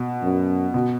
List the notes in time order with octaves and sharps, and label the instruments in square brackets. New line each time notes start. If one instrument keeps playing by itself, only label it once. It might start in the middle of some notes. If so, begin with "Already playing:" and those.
Already playing: [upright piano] B2
[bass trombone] F#2
[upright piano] B2